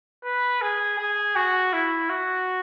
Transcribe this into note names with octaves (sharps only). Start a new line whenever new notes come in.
B4
G#4
G#4
F#4
E4
F#4